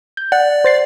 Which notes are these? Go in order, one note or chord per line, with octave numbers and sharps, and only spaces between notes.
G6
D5 F#5
C5 A6 C7